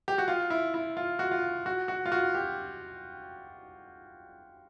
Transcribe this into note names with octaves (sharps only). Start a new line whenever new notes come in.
G4
F#4
F4
E4
E4
F4
F#4
F4
F#4
F#4
F4
F#4
G4